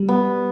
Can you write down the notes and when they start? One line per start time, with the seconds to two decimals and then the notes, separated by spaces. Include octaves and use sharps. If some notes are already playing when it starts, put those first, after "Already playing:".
Already playing: G3
0.08 B3